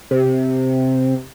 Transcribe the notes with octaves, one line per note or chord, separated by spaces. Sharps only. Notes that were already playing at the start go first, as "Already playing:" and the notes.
C3